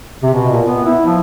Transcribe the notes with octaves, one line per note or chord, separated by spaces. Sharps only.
C3
B2
A#2
B3
E4
F3